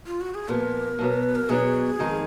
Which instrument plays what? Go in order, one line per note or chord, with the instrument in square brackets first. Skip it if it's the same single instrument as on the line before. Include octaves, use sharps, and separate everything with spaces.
[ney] F4
F#4
G#4
[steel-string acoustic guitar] A#2 F3 B3 [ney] A#4
[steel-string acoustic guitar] B2 F#3 B3
[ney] B4
A#4
[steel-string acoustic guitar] B2 F#3 B3 D4 [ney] G#4
[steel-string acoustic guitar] F2 D#3 G#3 D#4